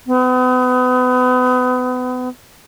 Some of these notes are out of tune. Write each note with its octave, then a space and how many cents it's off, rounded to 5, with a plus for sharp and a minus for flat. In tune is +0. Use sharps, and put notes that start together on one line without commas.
B3 +35